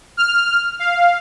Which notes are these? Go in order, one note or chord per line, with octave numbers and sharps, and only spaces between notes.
F6
F5